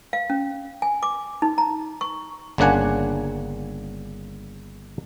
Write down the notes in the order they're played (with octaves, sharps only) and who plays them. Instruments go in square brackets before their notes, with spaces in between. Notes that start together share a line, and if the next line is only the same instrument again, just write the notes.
[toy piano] F5
C#4
G#5
D6
D#4
A#5
C#6
[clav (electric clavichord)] G1 C#3 A#3 D4 F#5 G#5